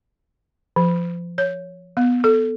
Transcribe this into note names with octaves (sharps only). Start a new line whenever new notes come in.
F3
C#5
B3
A4